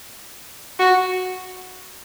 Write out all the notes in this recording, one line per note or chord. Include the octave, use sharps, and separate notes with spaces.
F#4